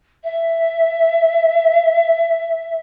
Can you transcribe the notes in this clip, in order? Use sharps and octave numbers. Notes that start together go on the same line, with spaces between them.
E5